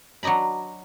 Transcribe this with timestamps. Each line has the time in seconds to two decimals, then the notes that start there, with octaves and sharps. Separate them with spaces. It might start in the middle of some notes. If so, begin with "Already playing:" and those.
0.23 F#3 D4 D#5 A#5 B5